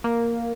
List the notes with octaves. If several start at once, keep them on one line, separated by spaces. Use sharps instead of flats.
A#3